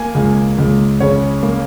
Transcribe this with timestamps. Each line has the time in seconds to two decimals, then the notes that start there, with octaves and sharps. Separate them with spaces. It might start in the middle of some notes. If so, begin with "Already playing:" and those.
Already playing: A#3 G#5
0.15 C#2
0.58 C#2
1.00 C#3 C#5
1.43 A#3